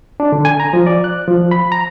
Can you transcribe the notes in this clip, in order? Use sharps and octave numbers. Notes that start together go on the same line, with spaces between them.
D4
D3
G#5
A#5
F3
D5
F#6
F3
B5
A#5